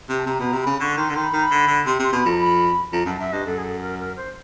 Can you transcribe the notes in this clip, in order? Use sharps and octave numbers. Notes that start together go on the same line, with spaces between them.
C3
A5
C3 A#5
B2 A#5
C3
C#3 B5
D3 C#6
D#3 C6
D3
D#3 C6
B5
D#3 A#5
B5
D3
D3
C3 C6
C3
C6
B2
F2 B5
A#5
B5
F2 A#5
F#2 A5
F#2 E5
G2 D#5
F#2 A4
G#4
A4
A#4
A#4
C5